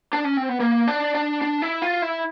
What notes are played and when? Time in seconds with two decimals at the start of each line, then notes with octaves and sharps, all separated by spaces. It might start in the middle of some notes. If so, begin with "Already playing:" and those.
0.13 D4
0.25 C#4
0.37 C4
0.49 B3
0.60 A#3
0.88 D4
1.15 D4
1.42 D4
1.62 E4
1.82 F4
2.02 E4